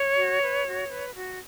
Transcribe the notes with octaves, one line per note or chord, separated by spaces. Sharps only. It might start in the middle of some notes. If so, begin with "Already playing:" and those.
Already playing: C#5
F#4
B4
F#4
B4
F#4